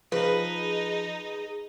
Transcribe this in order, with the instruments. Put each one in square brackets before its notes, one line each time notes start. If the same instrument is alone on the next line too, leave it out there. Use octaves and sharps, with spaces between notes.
[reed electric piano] F3 [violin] D#4 [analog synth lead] G#4 [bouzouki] B4